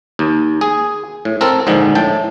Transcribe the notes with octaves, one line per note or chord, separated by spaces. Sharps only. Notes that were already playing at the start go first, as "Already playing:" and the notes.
D#2
G#4
A2
C4 A4 A#4
A#1 G#2 D3 D#3
A2 G5 A5